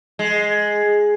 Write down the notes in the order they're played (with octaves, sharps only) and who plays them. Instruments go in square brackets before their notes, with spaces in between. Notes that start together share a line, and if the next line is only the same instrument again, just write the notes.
[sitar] G#3